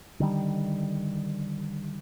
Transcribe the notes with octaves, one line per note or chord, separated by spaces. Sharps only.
D3 D#3 G3